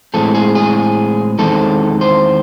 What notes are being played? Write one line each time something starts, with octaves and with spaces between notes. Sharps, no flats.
A2 E3 G#3 C4 A4
G#4
G#4
E2 D#3 G#3 C4 A4
C5